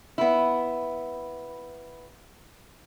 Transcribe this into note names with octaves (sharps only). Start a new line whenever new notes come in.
B3 E4